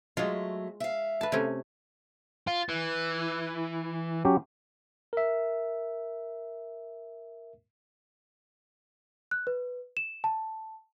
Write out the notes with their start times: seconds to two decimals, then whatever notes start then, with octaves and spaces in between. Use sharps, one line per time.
0.17 F#3 G#3 A3 F4
0.80 E5 F5
1.21 B4 A5
1.32 C3 A3 C#4
2.47 F4
2.69 E3
4.25 F#3 C#4 G4
5.13 A#4 E5
9.31 F#6
9.47 B4
9.97 E7
10.24 A5